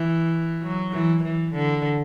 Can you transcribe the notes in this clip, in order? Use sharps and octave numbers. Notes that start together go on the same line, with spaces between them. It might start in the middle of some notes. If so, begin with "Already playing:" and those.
Already playing: E3
F#3
E3
E3
D3